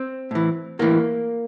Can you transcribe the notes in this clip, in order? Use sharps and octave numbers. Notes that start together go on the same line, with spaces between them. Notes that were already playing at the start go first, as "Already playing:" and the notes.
Already playing: C4
A2 E3
A2 E3 A#3